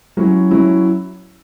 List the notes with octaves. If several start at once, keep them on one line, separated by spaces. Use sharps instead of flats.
F#3 C#4 E4
F#3 C#4 E4